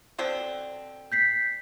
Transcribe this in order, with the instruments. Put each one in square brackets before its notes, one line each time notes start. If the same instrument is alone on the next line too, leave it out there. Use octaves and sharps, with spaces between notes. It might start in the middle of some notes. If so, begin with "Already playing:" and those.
[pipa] B2 D3 C4
[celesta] G6 B6 C7